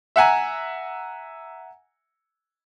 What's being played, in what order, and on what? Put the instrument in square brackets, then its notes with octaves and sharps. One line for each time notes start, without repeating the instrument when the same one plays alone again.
[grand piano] E5 F#5 G#5 A#5